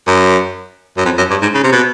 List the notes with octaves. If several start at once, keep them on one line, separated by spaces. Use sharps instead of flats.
F#2
F#2
F2
F#2
G2
G#2
C#3
C3
B2